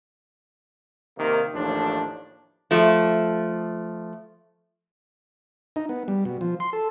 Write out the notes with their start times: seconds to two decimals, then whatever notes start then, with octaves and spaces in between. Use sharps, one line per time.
1.17 C3 D#3 A#3
1.53 A1 D#2 A2 F3 D4
2.71 F3 A3
5.76 D#4
5.89 B3
6.08 G3
6.25 B2
6.41 F3
6.60 C6
6.73 A4